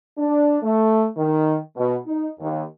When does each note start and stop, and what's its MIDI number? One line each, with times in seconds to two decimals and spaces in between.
0.17 0.57 62
0.62 1.06 57
1.17 1.56 51
1.77 1.95 47
2.06 2.28 63
2.40 2.62 39